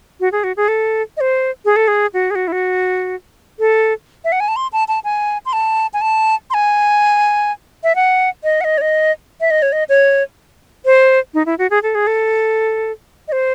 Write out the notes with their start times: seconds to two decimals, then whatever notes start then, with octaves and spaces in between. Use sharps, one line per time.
0.20 F#4
0.32 G#4
0.44 F#4
0.57 G#4
0.68 A4
1.17 D#5
1.21 C5
1.65 G#4
1.76 A4
1.88 G#4
2.14 F#4
2.31 G#4
2.35 F#4
2.48 E4
2.52 F#4
3.59 A4
4.25 E5
4.32 F#5
4.40 G#5
4.48 A5
4.56 C6
4.73 A5
4.88 A5
5.04 G#5
5.46 C6
5.53 A5
5.94 G#5
6.01 A5
6.50 C6
6.54 G#5
7.84 E5
7.96 F#5
8.44 D#5
8.61 F#5
8.64 D#5
8.78 C#5
8.81 D#5
9.41 E5
9.51 D#5
9.62 C#5
9.72 D#5
9.89 C#5
10.85 C5
11.34 D#4
11.46 E4
11.58 F#4
11.70 G#4
11.83 A4
11.95 G#4
12.07 A4
13.28 D#5
13.32 C5